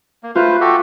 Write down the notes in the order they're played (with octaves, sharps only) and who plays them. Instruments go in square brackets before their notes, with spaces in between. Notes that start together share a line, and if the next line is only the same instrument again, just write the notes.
[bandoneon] A#3
[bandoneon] A3 B4 C5 [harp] F4
[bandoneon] F#4 G4 A4